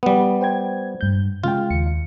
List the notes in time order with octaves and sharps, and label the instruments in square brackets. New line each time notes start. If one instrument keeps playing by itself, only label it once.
[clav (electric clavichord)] G3 B3
[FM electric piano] C5 G5 G#6
G2 G6
[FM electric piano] C#3 G#3 G5 [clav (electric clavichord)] F4
[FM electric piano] D#2 C#7